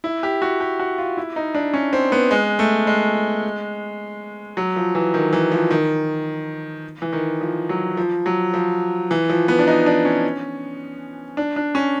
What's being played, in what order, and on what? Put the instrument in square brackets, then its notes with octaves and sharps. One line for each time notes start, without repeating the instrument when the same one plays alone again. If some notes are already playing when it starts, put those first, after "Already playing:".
[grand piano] E4
G4
F#4
G4
F#4
F4
E4
D#4
D4
C#4
C4
B3
G#3
A3
G#3
F#3
F3
E3
D#3
E3
F3
D#3
E3
D#3
F3
F#3
F3
F#3
F3
E3
F3
B3
D4
D#4
D4
C#4
D4
D4
C#4